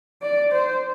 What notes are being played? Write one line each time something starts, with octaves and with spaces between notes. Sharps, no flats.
D5
C5